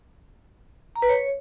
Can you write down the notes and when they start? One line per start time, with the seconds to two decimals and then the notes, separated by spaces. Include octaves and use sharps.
0.96 A#5
1.02 B4
1.09 C#5